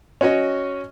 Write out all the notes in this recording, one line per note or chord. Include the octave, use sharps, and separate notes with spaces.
C#4 F#4 C#5 D#5